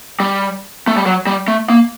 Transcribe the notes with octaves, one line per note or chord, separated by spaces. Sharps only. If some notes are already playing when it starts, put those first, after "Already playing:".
G3
A3
G3
F#3
G3
A3
A#3